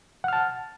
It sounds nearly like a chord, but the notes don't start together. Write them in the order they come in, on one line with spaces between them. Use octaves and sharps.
F#5 F6 A5